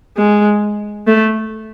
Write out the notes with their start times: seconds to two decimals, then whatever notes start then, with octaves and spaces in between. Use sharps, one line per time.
0.17 G#3
1.07 A3